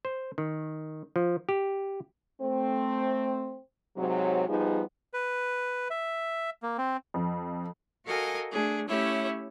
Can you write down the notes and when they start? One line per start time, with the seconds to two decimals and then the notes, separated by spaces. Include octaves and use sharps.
0.05 C5
0.38 D#3
1.16 F3
1.49 G4
2.41 A3 C4
3.97 G#2 C3 F#3
4.49 F3 G3 B3 D#4 G#4
5.13 B4
5.90 E5
6.63 A#3
6.78 C4
7.14 F2
8.04 F#4 A4 A#4 D#5 F5 G#5
8.51 A3 D4 G#4
8.87 A3 C#4 E4 G4 C#5 E5